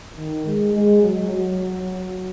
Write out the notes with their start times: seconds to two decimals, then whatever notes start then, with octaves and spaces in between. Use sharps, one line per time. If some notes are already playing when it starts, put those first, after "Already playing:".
0.18 D#3
0.46 G#3
0.74 G#3
1.02 F#3
1.30 F#3